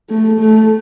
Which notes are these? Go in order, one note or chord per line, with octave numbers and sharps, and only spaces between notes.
A3
A3